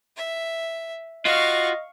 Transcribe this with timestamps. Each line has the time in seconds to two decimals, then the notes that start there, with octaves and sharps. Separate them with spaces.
0.17 E5
1.25 F4 F#4 D#5 F5 C#6